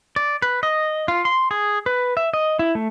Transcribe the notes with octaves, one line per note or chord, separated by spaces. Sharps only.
D5
B4
D#5
F4
C6
G#4
B4
E5
D#5
E4
A3